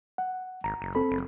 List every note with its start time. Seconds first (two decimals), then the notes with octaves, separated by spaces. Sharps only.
0.18 F#5
0.64 G#1 A#5
0.82 F#1
0.95 C4 A4 B5
1.11 F#1